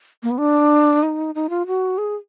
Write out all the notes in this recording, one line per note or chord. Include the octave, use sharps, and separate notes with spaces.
A#3
B3
D4
D#4
D#4
F4
F#4
G#4